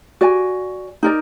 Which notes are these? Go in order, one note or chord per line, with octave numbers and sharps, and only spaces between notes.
F#4 D5 G#5
D#4 A#4 D5